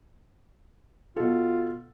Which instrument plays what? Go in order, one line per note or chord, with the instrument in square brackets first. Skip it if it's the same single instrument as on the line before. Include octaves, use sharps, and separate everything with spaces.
[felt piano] B2 A4 [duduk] F4